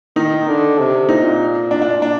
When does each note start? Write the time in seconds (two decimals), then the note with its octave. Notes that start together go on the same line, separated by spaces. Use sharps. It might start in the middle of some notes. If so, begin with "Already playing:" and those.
0.16 D#3 D#4
0.47 D3
0.78 C3
1.09 A#2 D#4
1.71 D4
1.82 D4
2.02 D4